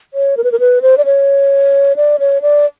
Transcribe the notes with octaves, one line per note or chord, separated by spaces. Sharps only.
C#5
A#4
B4
A#4
B4
C5
D5
C#5
D5
C#5
D5